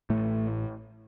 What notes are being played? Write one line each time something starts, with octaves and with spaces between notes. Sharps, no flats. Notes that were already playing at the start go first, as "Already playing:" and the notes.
A1 A2 A3